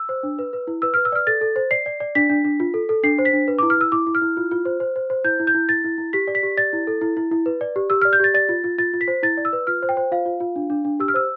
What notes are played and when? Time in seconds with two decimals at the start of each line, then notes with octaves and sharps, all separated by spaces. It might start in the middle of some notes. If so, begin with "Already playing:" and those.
Already playing: E6
0.09 C5
0.23 D4
0.39 B4
0.53 B4
0.67 E4
0.82 B4 E6
0.94 B4 F6
1.05 E6
1.12 D5 F6
1.27 A4 A6
1.41 A4
1.56 C5
1.71 D5 C7
1.86 D5
2.00 D5
2.15 D4 B6
2.29 D4
2.45 D4
2.60 F4
2.74 A4
2.89 A4
3.03 D4 C7
3.19 C5
3.25 B6
3.33 D4
3.48 B4
3.59 E4 D6
3.70 F6
3.77 E4 E6
3.92 E4 D6
4.07 E4
4.15 F6
4.22 E4
4.37 F4
4.51 F4
4.65 C5
4.80 C5
4.96 C5
5.10 C5
5.25 E4 G6
5.40 E4
5.47 G6
5.55 E4
5.69 E4 A6
5.84 E4
5.98 E4
6.13 G4 B6
6.27 D5
6.35 B6
6.43 G4
6.57 D5 A6
6.73 E4
6.87 A4
7.01 E4
7.17 E4
7.31 E4
7.46 B4
7.61 D5
7.76 G4
7.90 G4 E6
8.02 D5 F6
8.13 G6
8.20 G4 A6
8.34 D5 A6
8.49 F4
8.64 F4
8.78 F4 A6
8.94 F4
9.01 B6
9.08 C5
9.23 E4 A6
9.38 D5
9.45 E6
9.53 B4
9.67 F4 F6
9.83 C5
9.89 G5
9.97 C5
10.11 F4 F5
10.26 F4
10.40 F4
10.56 D4
10.70 D4
10.85 D4
11.00 G4 E6
11.08 F6
11.14 C5 E6